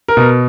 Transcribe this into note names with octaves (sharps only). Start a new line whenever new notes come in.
A#4
B2